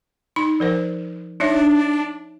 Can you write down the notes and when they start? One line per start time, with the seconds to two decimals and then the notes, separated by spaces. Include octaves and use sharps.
0.36 D#4 B5
0.60 F3 A#4 C5
1.40 D4 D#4 C#5 E5